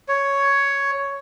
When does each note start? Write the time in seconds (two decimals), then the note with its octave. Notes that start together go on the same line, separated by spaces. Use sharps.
0.08 C#5